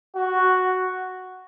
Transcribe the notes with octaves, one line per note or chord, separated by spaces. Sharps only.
F#4